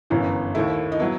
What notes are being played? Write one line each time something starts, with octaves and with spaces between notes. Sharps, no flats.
G1 F#2 E3 B3
D#2 D#3 A3 E4
D#4
F#3 B3 E4